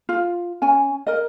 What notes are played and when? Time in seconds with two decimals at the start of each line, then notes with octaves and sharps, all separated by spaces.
0.09 F4
0.62 C#4 G#5
1.07 A#4 D#5